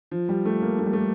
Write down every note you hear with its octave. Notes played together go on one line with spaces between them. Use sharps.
F3
G3
A3
A#3
A3
G3
A3